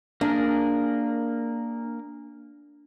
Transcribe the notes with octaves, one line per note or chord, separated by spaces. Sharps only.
A#3 D4 G#4 A#4